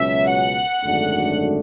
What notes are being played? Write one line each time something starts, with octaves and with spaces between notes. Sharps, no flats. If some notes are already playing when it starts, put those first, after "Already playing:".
Already playing: C#2 B2 F#3 C#4 E5
F#5
G#1 F#2 D3 A3 D4